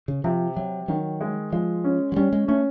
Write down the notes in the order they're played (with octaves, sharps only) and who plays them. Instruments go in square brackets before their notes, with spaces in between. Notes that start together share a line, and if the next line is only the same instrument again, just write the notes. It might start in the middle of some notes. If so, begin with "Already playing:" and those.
[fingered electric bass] C#3
[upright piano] C3 [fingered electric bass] F3
[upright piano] C3 [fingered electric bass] F#3
[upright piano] D#3 [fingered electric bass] F#3
[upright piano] G#3
[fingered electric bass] F3 [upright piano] G#3
[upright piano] C#4
[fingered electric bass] F#3
[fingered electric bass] G3 [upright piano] C#4
[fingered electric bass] G#3
[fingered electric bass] A3 [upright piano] C#4